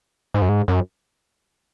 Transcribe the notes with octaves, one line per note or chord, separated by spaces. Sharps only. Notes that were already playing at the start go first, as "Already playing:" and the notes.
G#2
F#2
G#2
F#2